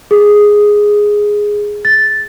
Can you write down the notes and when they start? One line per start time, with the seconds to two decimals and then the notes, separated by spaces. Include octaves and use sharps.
0.11 G#4
1.85 A6